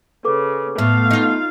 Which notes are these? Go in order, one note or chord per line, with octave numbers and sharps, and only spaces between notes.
C#3 A4 B4 D6
A2 A3 B3 F5
D#4 F4